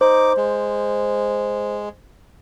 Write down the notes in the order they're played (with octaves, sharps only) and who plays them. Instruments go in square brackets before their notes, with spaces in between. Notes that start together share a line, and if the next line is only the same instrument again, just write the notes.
[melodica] D#4 D6 [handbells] C5
[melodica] G#3